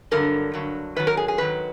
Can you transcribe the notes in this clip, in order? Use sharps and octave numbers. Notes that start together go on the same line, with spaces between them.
G2 D3 F#3 A#4
G2 D3 F#3
G#2 D#3 F#3 B4
A#4
G#4
G#4
G#2 D#3 F#3 B4